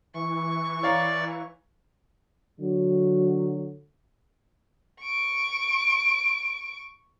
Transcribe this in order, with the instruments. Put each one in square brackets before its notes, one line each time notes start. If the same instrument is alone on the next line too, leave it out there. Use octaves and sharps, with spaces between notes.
[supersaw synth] E3 [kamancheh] C#6
[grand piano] C#5 F5 A#5 [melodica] D5
[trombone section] D3 F#3
[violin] C#6 D7